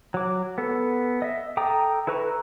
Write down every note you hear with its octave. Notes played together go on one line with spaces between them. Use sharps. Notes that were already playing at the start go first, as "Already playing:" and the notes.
F#3 D6
B3 A4
D#5 E5
A4 G5 A#5 D6 D#6
E4 A4 B4 A#5 C#6